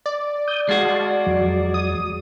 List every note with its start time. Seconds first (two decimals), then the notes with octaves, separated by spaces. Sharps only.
0.06 D5
0.48 D#6 G6
0.69 G#3 F#4 F5 A5 C6
1.26 F2 F#3
1.74 D#6